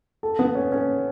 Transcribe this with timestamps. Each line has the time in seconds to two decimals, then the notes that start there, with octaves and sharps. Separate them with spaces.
0.23 A4
0.39 B3
0.55 C#4
0.72 C#4